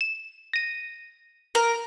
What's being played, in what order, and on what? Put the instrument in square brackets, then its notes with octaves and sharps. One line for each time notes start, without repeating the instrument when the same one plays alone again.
[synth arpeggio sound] E7
A#6 D#7
[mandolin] A#4